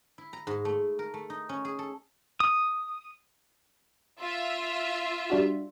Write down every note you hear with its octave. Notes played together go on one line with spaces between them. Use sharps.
E4
A#5
G#2
A3
A#4
A3
D#4
C#4
G#4
A4
D#6
F4 E5
G3 D4 F#4